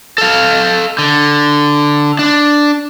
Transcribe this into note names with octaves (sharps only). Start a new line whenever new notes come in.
A4 F5
D3
D4